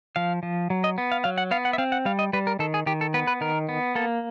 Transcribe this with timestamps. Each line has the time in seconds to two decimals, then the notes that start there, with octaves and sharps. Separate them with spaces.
0.16 F3 F5
0.43 F3
0.70 F#3
0.84 D#5
0.98 B3
1.12 F5
1.24 F#3 F5
1.38 F#5
1.51 B3 F5
1.65 F#5
1.73 E5
1.78 C4 F5
1.92 F#5
2.05 G3 F5
2.19 D#5
2.33 G3 B4
2.47 A#4
2.59 D#3 A4
2.74 G#4
2.86 D#3 G4
3.01 A4
3.14 B3 B4
3.27 B4
3.41 D#3 A#4
3.69 B3
3.95 A#3 A4